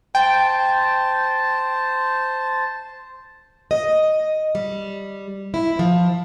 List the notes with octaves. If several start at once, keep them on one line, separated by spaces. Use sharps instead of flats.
C5 G5 A5
D#5
G3
E4
F3